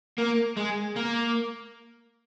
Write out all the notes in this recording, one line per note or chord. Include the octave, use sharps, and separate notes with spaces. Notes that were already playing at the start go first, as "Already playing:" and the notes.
A#3
G#3
A#3